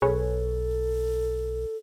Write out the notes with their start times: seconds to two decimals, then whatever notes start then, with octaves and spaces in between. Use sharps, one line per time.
0.02 B1 G#4 A4 B4 C#5